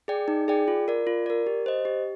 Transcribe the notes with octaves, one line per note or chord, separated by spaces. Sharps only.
G#4 D5 G5
D#4
G#4 D5 G5
F4
A#4 D5
F4
A#4 D5
G4
C5 D#5
G4